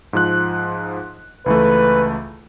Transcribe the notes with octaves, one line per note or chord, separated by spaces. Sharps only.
G#2 F3 F#6
C#2 E3 A3 B4